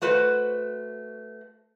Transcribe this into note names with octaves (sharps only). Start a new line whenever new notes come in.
A3 F#4 B4 C5